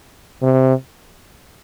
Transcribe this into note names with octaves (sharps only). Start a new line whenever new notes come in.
C3